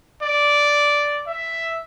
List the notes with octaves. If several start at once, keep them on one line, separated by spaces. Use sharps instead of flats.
D5
E5